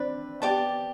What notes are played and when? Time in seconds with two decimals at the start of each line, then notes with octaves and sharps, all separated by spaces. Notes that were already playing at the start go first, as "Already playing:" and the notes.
Already playing: C4 D4 B4 D5
0.42 B3 G4 D5 A5 D6